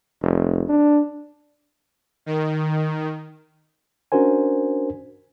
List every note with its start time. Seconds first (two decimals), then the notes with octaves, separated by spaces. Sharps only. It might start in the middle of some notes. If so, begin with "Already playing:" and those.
0.22 F1
0.69 D4
2.26 D#3
4.12 C#4 D4 F#4 A#4 C5 G#5